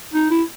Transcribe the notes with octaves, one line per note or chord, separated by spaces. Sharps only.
D#4
E4